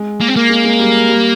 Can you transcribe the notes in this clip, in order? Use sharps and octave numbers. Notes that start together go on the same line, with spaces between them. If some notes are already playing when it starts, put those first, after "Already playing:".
Already playing: G#3
A#3
C4
A#3
G#3
G#3
G3
G3